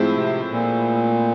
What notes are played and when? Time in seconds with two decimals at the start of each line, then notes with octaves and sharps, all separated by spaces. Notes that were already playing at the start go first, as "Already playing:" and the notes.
Already playing: A2 F3 G#3 C4 E4
0.16 C3
0.51 A#2